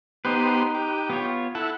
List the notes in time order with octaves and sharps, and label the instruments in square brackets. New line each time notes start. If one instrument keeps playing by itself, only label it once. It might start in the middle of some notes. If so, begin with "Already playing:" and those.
[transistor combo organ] B3 G4 C5 [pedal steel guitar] D#4 B4
[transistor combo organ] G4
[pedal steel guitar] B3 F4 C#5
[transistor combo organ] E4 F#5 [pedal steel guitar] A4